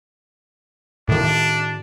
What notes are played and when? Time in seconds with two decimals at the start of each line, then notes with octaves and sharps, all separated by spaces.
1.09 A2 D#3 D4